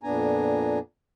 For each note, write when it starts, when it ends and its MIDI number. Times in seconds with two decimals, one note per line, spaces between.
0.03 0.79 41
0.03 0.79 46
0.03 0.79 59
0.03 0.79 62
0.03 0.79 80
0.03 0.79 82